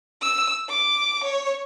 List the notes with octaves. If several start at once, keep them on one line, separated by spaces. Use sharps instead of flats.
E6
D6
C#5